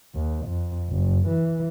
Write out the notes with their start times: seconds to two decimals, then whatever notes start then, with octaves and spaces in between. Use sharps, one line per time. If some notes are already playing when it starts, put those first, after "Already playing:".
0.15 D#2
0.46 F2
0.90 F#1
1.28 E3